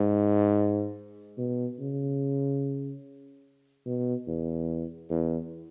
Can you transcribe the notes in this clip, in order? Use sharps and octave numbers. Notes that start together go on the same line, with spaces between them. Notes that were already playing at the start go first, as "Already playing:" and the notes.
Already playing: G#2
B2
C#3
B2
E2
E2